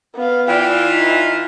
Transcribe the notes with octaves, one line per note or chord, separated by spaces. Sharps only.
B3 F5
E3 F4 D5 G5
D#4